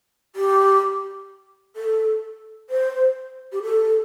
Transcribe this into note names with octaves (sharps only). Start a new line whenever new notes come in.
G4
A4
C5
G4
A4